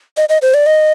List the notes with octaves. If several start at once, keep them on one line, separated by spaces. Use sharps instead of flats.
D#5
D#5
C5
D5
D#5